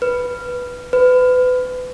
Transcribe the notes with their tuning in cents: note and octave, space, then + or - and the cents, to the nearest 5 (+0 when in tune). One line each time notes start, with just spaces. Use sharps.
B4 +0
B4 +30